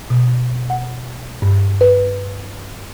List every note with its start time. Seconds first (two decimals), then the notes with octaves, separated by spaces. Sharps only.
0.10 B2
0.70 F#5
1.42 G2
1.81 B4